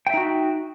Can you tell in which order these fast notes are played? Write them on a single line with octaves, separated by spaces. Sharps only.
G5 E5 D#4 F#4